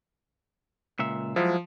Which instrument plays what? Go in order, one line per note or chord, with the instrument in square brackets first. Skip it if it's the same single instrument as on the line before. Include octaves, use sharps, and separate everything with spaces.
[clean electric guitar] C#2 A#2 E5
[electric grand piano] F3 [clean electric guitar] F#3 G#3 E4